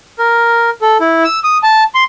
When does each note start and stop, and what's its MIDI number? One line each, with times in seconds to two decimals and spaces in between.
0.19 0.70 70
0.82 0.98 69
1.00 1.24 64
1.24 1.39 88
1.44 1.58 87
1.63 1.84 81
1.95 2.04 84